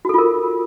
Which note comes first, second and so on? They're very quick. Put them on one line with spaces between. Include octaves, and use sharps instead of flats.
F#4 A4 F4 A#4